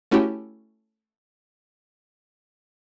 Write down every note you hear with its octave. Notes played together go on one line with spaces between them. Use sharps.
A3 C#4 E4 F#4 G4